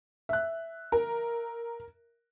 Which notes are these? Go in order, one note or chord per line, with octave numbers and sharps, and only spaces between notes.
E5 F#6
A#4